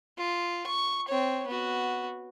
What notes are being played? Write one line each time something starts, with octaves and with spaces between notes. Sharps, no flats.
F4
C#6
C4 C#5
B3 F#4